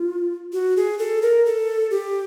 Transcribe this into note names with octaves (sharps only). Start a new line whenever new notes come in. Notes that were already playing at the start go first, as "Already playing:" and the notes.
Already playing: F4
F#4
G#4
A4
A#4
A4
G4